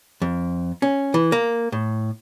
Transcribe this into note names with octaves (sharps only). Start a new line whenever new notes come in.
F2
C#4
E3
A#3
A2